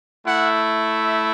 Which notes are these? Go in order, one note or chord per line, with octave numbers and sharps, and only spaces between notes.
A3 E4 F#5
E5